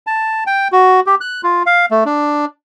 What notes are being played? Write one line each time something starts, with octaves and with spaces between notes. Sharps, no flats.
A5
G5
F#4
G4
F#6
F4
F5
A3
D4